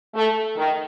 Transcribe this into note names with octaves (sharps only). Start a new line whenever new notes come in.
A3
D#3